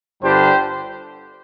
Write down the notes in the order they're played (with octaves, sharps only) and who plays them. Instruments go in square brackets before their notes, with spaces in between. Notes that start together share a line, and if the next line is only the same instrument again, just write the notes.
[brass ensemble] G1 G2 D3 G3 D4 G4 C5